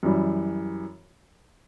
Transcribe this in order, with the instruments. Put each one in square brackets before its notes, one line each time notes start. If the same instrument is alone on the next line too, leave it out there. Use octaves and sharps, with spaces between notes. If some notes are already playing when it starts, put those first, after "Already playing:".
[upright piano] F#2 E3 G3